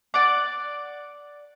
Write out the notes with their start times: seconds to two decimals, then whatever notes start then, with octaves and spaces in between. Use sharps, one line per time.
0.14 D5 F#5 D6